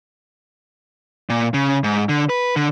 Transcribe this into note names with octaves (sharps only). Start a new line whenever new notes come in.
A#2
C#3
G#2
D3
B4
D3